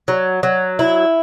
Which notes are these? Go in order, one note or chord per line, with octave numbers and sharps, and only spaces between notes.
F#3
F#3
E4